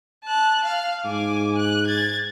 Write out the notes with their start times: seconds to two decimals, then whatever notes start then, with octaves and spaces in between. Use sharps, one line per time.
0.24 A5 F#6
0.64 F5 F6
1.05 G#2 G#5 D6
1.58 F#6
1.87 G#6 A6